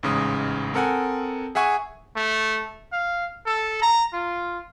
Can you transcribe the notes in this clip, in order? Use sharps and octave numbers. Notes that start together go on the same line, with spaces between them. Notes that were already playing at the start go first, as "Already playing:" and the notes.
A1 G#2 C#3 G#3 D#6
C4 A4 A#4 F#5 G#5
G#4 E5 F#5 G#5 C#6
A3
F5
A4
A#5
F4